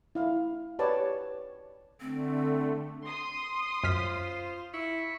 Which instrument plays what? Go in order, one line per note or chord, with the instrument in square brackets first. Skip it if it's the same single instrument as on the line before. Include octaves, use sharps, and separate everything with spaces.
[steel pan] E4 F5
G4 B4 C#5 D5 A5
[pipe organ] D3 A3 [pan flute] C4
[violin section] C6 D#6
[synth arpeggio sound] F#2 F6 B6 [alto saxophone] F4 [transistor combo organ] C5
[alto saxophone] E4 [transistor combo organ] B5 C#6